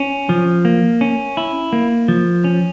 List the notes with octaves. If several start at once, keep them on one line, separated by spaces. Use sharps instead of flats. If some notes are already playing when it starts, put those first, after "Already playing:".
Already playing: C#4
F3
A#3
C#4
E4
A#3
F3
C#4